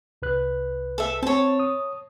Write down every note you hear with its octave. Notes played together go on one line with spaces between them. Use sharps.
C2 B4 F#6
A4 E5
C4 C#5 A5
D#6